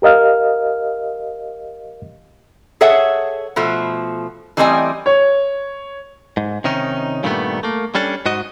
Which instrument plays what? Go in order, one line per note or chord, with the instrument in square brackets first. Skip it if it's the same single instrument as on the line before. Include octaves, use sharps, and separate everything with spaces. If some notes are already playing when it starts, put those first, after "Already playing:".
[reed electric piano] G4 A#4 D#5 F5 F6
[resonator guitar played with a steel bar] G#4 A4 C#5 E5 F#5
B2 F3 A3
E3 G3 A3 C4 D#5 G#5
[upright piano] C#5
[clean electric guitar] G#2
C3 D#3 C#4 D#4
G2 A#2 D#3 G3 A3 B3
A3 A#3
G3 C#4 D4 A4
G#2 F#4 D#5